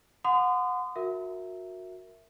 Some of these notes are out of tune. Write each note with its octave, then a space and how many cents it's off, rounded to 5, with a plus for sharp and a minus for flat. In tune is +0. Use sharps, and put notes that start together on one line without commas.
F#5 -25 C6 -40 D#6 -35
F#4 -20 A#4 -10 E5 +0